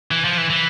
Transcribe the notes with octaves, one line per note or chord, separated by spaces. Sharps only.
E3
F3
E3
E3